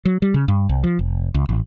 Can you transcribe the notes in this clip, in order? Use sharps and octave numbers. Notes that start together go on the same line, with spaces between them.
F#3
G3
C#3
G2
C2
F3
F1
C#2
A1